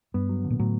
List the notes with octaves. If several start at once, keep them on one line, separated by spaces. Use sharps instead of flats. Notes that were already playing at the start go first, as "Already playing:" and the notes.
G2 B3
F#3
D3
A#2
A2 F#3